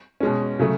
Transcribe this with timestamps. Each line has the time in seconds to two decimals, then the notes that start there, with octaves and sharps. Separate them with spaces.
0.20 B2 G#3 C#4
0.59 C#3 F#3 A3